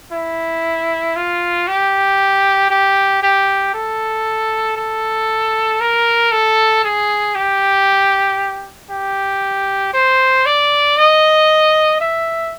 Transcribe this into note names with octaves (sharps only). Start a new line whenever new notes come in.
E4
F4
G4
G4
G4
A4
A4
A#4
A4
G#4
G4
G4
C5
D5
D#5
E5